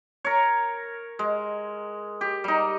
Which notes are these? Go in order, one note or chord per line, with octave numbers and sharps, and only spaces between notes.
A#4 C#5
G#3
G4
G3 D#4